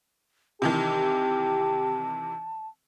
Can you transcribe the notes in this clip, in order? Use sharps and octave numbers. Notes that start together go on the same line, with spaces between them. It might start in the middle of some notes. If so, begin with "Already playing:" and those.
C3 D#3 E3 G4 A5